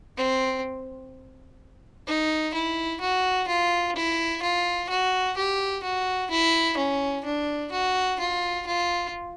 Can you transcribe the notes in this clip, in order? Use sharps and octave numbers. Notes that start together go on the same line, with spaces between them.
C4
D#4
E4
F#4
F4
E4
F4
F#4
G4
F#4
E4
C#4
D4
F#4
F4
F4